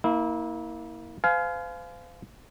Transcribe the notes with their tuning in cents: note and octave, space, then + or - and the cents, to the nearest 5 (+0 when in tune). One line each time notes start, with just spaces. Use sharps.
A#3 +0 E4 -30
C5 -40 F5 +0 G#5 +30